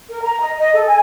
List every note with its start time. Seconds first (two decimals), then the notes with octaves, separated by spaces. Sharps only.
0.10 A#4
0.23 A#5
0.40 D#5
0.58 D#5
0.73 A4
0.86 G#5